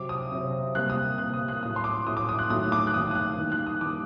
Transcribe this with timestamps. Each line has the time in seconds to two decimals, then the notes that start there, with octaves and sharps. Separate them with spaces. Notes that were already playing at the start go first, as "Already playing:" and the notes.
Already playing: C3 F#3 C4 D6
0.09 D#6
0.32 C3 F#3 C4
0.75 C3 G3 A#3 F#6
0.90 D#6
1.18 C3 G3 A#3 F#6
1.34 D#6
1.48 F#6
1.63 A2 F#3 A3 D#6
1.76 C6
1.84 D6
2.06 A2 F#3 A3 D#6
2.17 D6
2.29 D#6
2.39 F#6
2.50 D#3 F#3 A3 D#6
2.72 D6
2.87 F#6
2.94 D#3 F#3 A3 D#6
3.11 D#6
3.15 F#6
3.38 D#3 G3 A#3
3.52 F#6
3.67 D#6
3.81 D#3 G3 A#3 D6